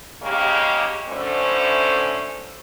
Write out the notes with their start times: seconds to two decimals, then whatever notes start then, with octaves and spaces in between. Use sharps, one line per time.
0.22 G#2 C#3 A#3 G4 C#5 D#5
1.07 F#2 A2 D3 A3 C#4 C5